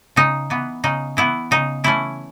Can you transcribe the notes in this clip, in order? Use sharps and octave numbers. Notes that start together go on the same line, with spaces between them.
C#3 D#4
E3 B3
C#3 D#4
E3 B3 E4
C#3 D#4
E3 A3 C#4 E4